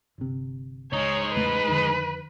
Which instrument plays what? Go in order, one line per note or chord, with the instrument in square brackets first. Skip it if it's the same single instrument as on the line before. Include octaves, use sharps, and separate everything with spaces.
[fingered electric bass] G1 C3
[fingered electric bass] C#2 [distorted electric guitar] G#3 D#4 [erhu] C#5
[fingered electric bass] E2 C#3 A3 [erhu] B4
[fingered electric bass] F2 D3 D#3